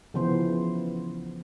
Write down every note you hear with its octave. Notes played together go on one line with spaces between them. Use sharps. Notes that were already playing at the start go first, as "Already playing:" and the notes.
C#3 E3 F3 B3 C5